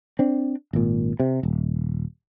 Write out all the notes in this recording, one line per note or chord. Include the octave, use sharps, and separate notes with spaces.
C4 D4
G#1 A#2
C3
D#1